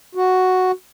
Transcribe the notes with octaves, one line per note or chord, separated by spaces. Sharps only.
F#4